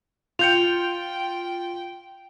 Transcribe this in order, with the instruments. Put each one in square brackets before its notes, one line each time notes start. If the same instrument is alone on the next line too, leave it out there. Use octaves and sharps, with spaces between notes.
[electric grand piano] F4 G6 C#7 [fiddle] G5 [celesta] F7